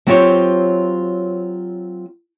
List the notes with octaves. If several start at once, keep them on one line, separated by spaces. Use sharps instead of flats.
F#3 C4 F4 G4 C5 C#5